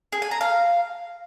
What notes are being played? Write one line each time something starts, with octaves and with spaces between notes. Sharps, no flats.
G#4
G#5
A#5
F5